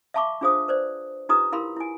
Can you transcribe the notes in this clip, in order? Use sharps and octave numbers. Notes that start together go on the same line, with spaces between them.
E5 F5 A5 B5 C#6 D6
D4 F4 G#4 C5 F5 D#6
B4 C5 D5
D#4 F4 G4 B4 A#5 D#6
E4 G4 A#4 F5 B5 C6
E4 G#5